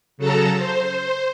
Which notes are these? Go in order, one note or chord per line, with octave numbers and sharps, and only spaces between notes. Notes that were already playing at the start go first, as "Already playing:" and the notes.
C#3 F#3 A4 A5 A#5
C5